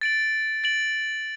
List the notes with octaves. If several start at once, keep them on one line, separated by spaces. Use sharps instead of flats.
A6 D7 F#7
A6 D7 F#7